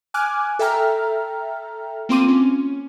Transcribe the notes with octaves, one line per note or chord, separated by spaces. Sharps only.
G#5 D6 F6 F#6 G#6
A4 E5 G5 A#5 F6
A#3 C4 F4 C6 D6 D#7
C#4